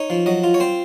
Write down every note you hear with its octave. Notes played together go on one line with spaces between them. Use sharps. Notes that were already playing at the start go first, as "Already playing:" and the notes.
Already playing: D#4 C#5
F3
F#3 D#5
F4
C#5
C4 C5